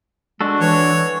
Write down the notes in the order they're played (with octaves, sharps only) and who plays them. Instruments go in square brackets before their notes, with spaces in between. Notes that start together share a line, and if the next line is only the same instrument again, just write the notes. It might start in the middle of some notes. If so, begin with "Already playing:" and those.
[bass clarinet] G#3 [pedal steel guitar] D4 F#4 A4
[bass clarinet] E3 [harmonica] C#5